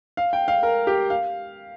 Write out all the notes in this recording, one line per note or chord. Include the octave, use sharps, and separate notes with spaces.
F5
G5
F5
A#4
G4
F5